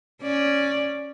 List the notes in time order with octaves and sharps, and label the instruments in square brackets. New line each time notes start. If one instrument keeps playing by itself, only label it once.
[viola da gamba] C#4 D5